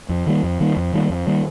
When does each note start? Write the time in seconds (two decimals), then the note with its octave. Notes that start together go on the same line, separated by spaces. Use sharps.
0.09 F2
0.26 D#3 G3 A#3
0.43 F2
0.60 D#3 G3 A#3
0.77 F2
0.93 D#3 G3 A#3
1.10 F2
1.27 D#3 G3 A#3